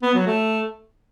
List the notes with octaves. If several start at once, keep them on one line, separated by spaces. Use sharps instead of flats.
B3
F#3
A3